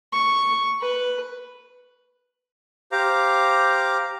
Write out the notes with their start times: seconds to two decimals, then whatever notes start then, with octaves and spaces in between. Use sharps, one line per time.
0.13 C#6
0.81 B4
2.92 G4 C5 F5 A#5 D6